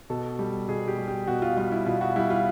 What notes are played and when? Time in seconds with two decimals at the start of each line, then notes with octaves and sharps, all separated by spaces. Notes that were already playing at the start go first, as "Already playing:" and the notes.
0.10 B2 A4
0.39 G3
0.68 B2 G#4
0.88 G4
0.98 G3
1.08 G4
1.27 B2 F#4
1.42 F4
1.57 G3 F4
1.72 E4
1.86 B2 F4
2.01 F#4
2.16 G3 E4
2.30 F4